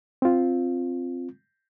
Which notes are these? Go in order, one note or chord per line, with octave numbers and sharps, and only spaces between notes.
C4 F4